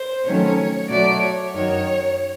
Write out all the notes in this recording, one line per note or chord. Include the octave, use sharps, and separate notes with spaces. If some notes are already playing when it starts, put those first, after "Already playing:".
Already playing: C5
C3 D#3 F#3 A3 C#4 C#5
B2 F#3 A3 D5
C#5
F#2 D#3 F#3 C#5